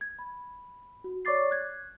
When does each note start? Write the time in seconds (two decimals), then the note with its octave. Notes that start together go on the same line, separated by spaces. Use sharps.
0.01 G#6
0.19 B5
1.04 F#4
1.25 C#5 D5 C#6 D6 A6 C7
1.51 F#6 G#6